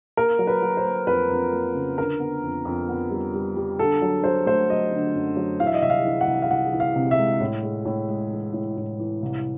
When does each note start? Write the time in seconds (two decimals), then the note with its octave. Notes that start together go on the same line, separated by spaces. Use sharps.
0.17 A#3 A#4
0.39 F#3
0.47 B4
0.62 F#3
0.77 C5
0.85 A#3
1.07 F2 B4
1.29 F2
1.52 A#3
1.75 C#3
1.98 D3 A#4
2.20 B3
2.43 F2
2.65 F2
2.89 B3
3.11 G3
3.34 G3
3.57 G3
3.79 D3 A4
4.02 F#3
4.24 F#3 C5
4.46 A3 C5
4.69 F#3 D#5
4.91 D3
5.15 F#2
5.37 F#3
5.59 E3 F5
5.67 E5
5.74 D#5
5.82 C2 E5
5.90 F5
6.05 E3
6.21 F#5
6.28 C2
6.42 F5
6.51 C2 F#5
6.73 E3
6.80 F5
6.96 C3
7.11 E5
7.19 G#3
7.40 A2
7.63 G#3
7.85 A2
8.09 G#3
8.31 E3
8.53 A2
8.77 A2
8.99 E3
9.22 C2